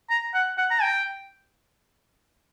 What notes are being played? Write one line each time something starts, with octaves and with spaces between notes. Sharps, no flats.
A#5
F#5
F#5
A#5
G5